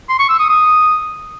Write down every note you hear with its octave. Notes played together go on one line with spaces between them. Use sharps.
C6
C#6
E6
D#6
D#6